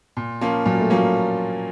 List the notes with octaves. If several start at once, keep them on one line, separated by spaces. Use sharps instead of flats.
A#2
F3 A#3 C#4
A#2 F#3
A3
F3 F#3 A#3 C#4